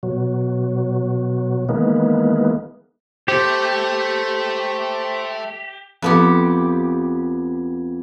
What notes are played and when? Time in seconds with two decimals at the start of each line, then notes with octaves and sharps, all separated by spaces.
0.03 B2 F#3
1.69 D#3 E3 G#3 A#3 B3
3.28 A3 G4 C5
6.02 F2 B3 G4